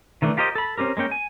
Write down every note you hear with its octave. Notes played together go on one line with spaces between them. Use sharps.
D#3 E3 A3 D4
F4 G4 A#4 C5 D#5
A4 B5
C4 C#4 G4 A#4
G#3 A#3 C#4 G5
G#5